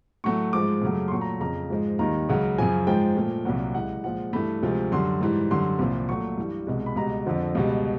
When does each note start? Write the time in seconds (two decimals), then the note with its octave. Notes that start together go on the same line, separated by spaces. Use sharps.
0.24 A2 F#3 A3 C#6
0.53 G#2 F3 G#3 D6
0.82 F#2 C#3 F#3 A3
1.08 C6
1.11 A#2 F#3 A3 C#6
1.21 A#5
1.40 F2 C#3 F3 A#5
1.70 G#2 F3 G#3
1.99 D#2 D#3 G3 A#5
2.29 C#2 C#3 F#3
2.58 F#2 C#3 F3 G#5
2.87 G#2 F3 G#3 G5
3.16 A#2 F3 A3
3.45 C2 A#2 F#3
3.75 C#2 C3 E3 F#5
4.04 A#2 F3 G#3 F#5
4.33 G2 E3 A3 B5
4.62 D2 C3 F3 G#3
4.92 F#2 D3 G3 C6
5.21 G#2 E3 G3
5.50 F#2 D3 G3 C6
5.79 C2 A#2 F3
6.09 A#2 F#3 A3 C#6
6.38 G2 E3 G3
6.67 C2 B2 G#3
6.86 B5
6.96 C#2 B2 G3 A#5
7.26 F2 D3 F3
7.55 C#2 B2 G3